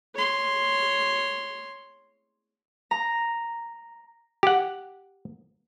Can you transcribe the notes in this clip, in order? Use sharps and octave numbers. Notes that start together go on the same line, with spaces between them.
C#5 C6
A#5
G4 F#5